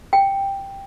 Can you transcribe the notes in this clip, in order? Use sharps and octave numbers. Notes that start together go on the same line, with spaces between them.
G5